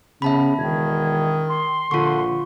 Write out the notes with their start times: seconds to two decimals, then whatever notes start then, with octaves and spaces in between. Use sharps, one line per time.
0.22 C#3 B3 E5 A5 B5
0.58 E1 D#3 G#6
1.48 C6
1.91 A#1 D3 F4 C#6